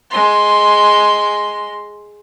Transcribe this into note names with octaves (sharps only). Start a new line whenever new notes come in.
G#3 C6